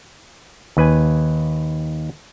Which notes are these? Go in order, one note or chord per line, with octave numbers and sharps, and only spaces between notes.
D#2 B4 G#5